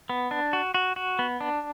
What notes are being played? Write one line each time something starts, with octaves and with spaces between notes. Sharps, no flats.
B3
D4
F#4
F#4
F#4
B3
D4